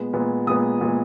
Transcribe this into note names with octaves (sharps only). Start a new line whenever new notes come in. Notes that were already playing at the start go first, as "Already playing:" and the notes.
Already playing: A#2 G#3 B3
A#2 G#3 B3
A#2 G#3 B3 D#6
A#2 G#3 B3